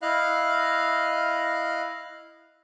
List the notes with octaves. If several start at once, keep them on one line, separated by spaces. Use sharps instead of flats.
E4 D#5 F5 F6 F#6